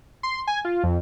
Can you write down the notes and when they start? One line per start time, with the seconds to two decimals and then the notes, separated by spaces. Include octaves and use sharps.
0.23 C6
0.47 G#5
0.65 F4
0.84 F2